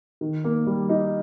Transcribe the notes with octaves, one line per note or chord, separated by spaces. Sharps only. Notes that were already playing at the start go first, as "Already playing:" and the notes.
D#3
A#3
G3
D#4